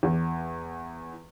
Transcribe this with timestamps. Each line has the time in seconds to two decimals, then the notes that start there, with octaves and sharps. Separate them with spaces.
0.03 E2